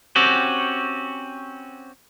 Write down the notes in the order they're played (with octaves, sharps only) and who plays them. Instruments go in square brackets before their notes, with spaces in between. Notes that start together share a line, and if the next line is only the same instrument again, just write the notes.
[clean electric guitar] C4 C#4 F#4 G4